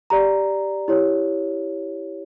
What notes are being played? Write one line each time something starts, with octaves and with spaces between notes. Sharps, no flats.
G4 D5 A#5
E4 G4 C#5